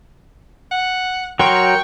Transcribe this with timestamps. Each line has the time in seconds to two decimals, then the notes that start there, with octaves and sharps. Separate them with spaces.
0.71 F#5
1.39 F#3 A#4 G5 C6 C#6